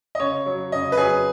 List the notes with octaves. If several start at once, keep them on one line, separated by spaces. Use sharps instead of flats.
D#5
C#3 C#5
F#3
C#3 D#5
B4
F#3 G#4